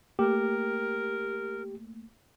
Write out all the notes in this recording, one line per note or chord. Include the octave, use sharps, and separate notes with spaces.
A3 A#3 G4 A#4